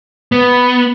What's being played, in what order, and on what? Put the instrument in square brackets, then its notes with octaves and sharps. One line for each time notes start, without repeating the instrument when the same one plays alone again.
[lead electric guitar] B3